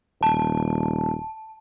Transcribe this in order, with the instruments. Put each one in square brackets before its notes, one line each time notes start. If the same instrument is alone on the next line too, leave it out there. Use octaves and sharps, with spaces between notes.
[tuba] D#1 [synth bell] A5